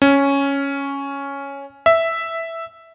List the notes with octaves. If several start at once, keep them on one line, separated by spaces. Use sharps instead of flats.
C#4
E5